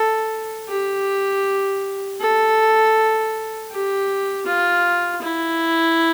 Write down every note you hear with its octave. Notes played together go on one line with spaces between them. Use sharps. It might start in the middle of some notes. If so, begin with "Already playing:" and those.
Already playing: A4
G4
A4
G4
F4
E4